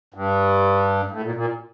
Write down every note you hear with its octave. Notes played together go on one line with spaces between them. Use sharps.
G2
A2
A#2
A#2